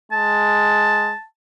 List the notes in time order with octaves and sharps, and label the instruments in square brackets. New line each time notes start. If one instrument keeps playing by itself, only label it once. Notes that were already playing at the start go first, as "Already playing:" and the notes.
[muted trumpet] G#3 [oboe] A5